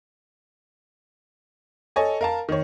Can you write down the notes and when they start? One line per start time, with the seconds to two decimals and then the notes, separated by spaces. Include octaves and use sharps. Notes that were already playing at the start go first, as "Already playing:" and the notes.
1.96 A4 C#5 D#5 G#5
2.21 A#4 F5 A5
2.49 D#3 C#5